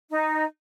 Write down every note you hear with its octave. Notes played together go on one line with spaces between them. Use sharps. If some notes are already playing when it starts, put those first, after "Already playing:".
D#4